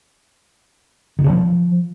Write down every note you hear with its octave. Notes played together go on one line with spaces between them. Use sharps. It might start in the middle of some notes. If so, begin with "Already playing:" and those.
D#3
C#3
F3